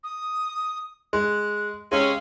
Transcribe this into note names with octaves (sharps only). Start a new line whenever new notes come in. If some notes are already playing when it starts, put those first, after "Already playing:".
D#6
G#3 F#6
C3 G#3 C#4 F5